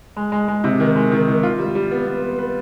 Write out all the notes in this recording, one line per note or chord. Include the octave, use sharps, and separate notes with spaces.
G#3
G#3
G#3
C3
D#3
G#3
D#3
D#3
F4
G3
G3
B3
B3
B3
B4